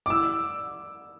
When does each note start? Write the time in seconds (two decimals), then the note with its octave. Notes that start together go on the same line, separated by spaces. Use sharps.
0.06 D6
0.10 E6